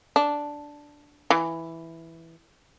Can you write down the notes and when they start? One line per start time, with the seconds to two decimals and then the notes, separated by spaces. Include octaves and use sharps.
0.16 D4
1.30 E3